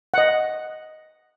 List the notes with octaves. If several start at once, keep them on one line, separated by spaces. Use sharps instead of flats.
D#5 F#5